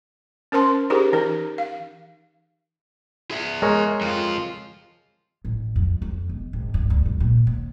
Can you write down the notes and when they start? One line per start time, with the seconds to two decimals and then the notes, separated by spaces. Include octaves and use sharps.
0.52 C#4 A#4 C5 A5 C6
0.90 D#4 G4 G#4 A#4 C5
1.13 E3 D#4 A#4
1.58 F5
3.31 G#4 E5
3.62 G#3 A#4 C#5
4.01 F2 F4
5.44 A1
5.76 F2
6.02 F2
6.29 E1
6.53 G#1
6.74 G2
6.90 D2
7.05 B1
7.20 A#2
7.47 D#2